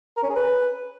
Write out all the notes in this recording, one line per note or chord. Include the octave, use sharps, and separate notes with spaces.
A#4
C#4
G#4
B4